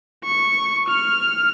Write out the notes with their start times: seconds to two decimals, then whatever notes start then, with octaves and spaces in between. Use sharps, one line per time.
0.24 C#6
0.88 F6